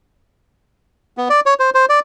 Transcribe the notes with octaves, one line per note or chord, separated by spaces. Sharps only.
B3
D5
C#5
C5
C5
D5